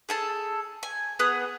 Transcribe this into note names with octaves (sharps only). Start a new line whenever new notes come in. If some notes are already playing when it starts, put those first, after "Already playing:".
G#4 A4 A5
G#5
B3 G#4 D#6 F#6